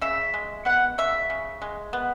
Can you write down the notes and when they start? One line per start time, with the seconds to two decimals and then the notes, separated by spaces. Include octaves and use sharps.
0.01 C#3 E5
0.34 G#3
0.65 B3 F#5
0.98 C#3 E5
1.30 C#3
1.62 G#3
1.93 B3